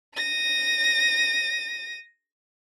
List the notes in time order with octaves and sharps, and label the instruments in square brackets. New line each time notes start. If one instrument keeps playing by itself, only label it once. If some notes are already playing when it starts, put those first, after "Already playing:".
[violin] A#6 D#7